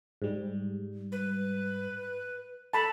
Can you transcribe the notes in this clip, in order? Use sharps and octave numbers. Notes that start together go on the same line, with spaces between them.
G#2 G3
B4
A4 A5 B5